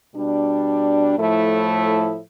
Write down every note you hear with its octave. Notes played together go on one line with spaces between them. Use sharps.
B2 G3 D4
A2 F3 A3 E4 A4